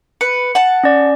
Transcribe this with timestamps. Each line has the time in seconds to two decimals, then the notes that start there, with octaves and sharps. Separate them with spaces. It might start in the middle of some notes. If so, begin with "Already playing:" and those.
0.21 B4 C#7
0.55 F#5 A5
0.84 C#4 D5